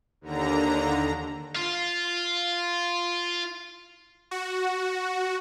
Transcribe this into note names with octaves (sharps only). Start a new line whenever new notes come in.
D#2 D3 A#5
F4 F5
F#4